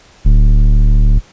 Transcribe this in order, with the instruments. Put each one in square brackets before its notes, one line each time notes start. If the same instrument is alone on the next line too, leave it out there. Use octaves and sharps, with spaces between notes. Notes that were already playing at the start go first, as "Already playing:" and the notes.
[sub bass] D1